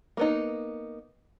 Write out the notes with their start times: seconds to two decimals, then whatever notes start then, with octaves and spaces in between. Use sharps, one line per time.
0.17 A#3 B3 D#4